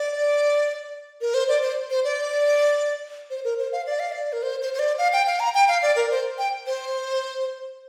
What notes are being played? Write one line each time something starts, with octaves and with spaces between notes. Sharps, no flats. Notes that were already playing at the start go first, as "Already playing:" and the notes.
Already playing: D5
A#4
C5
D5
C5
C5
D5
C5
A#4
C5
F5
D5
F5
D5
A#4
C5
C5
C5
D5
F5
G5
F5
A#5
G5
F5
D5
A#4
C5
G5
C5